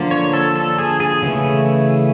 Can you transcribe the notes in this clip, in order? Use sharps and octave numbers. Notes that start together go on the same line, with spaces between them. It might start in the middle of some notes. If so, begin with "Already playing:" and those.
Already playing: D3 F3 A#3 D4
C#5
A4
A4
G#4
G#4
C#3 E3 A3